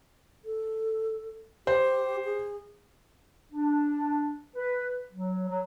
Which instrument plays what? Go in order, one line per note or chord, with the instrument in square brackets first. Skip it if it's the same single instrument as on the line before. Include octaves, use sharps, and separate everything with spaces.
[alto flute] A4
[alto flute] G4 [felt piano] C5
[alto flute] G#4
[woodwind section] D4
B4
F#3
F#3